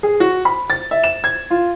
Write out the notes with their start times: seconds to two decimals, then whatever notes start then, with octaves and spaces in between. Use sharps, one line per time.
0.03 G#4
0.20 F#4
0.45 B5
0.70 A6
0.91 E5
1.04 E7
1.24 G#6
1.51 F4